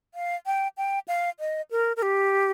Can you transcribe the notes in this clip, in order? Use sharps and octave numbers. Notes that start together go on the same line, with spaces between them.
F5
G5
G5
F5
D#5
A#4
A#4
G4